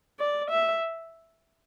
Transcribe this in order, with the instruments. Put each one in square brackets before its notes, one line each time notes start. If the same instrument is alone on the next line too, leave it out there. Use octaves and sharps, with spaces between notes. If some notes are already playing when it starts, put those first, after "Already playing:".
[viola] D5
E5